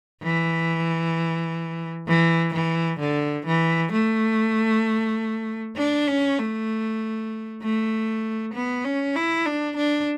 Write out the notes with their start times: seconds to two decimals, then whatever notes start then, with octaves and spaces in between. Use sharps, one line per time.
0.23 E3
2.08 E3
2.54 E3
3.00 D3
3.46 E3
3.92 A3
5.77 D4
6.08 C#4
6.39 A3
7.62 A3
8.54 B3
8.85 C#4
9.16 E4
9.46 D4
9.77 D4